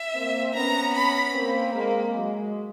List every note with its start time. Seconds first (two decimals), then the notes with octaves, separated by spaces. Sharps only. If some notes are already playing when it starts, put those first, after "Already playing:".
Already playing: E5
0.13 A#3 C4
0.54 B3 C#4 A#5
0.94 B5
1.33 A#3 C4
1.73 G#3 A#3
2.13 F#3 G#3